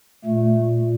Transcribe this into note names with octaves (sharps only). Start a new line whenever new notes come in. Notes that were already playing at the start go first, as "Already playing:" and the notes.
A#2 A3